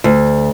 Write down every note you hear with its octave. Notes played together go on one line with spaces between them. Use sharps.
D2